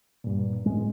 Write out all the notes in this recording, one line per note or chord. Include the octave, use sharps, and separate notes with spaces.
G2 A#2
A2 G#3